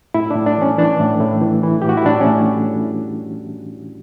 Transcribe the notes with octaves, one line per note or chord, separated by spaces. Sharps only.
A2 E4
D4
A2
D4
E3 C#4
E3 D4
A2
A2
E3
E3
A2 G4
F#4
E4
A2 D4
C#4
A2